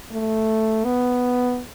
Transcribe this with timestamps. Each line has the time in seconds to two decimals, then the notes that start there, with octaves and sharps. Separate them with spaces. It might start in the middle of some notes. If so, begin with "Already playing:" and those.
0.12 A3
0.85 B3